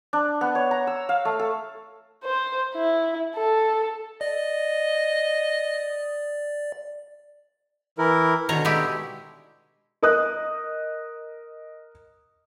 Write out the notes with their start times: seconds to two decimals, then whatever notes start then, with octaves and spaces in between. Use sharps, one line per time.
0.13 D4
0.41 B3
0.55 C#5
0.71 A#5
0.87 E6
1.09 F5
1.25 A3
1.39 A4
2.24 C5
2.74 E4
3.35 A4
4.21 D5 D#5
7.98 E3 E4 A#4
8.49 B2 D3 D#3 C#5 A#5
8.65 G#3 E4 G4
10.02 A#4 D#5 D#6 F#6